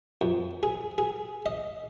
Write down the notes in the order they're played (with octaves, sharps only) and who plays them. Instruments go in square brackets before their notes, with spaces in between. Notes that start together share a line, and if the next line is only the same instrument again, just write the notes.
[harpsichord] F2
G#4
G#4
D#5